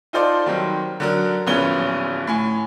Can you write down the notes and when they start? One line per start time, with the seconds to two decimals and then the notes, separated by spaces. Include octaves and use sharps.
0.13 D#4 F4 A4 C5 D5
0.46 D#3 F#3 G3 C4
1.00 D3 F#3 A#4
1.47 D1 A#1 B3 C#4 G7
2.27 A2 G#5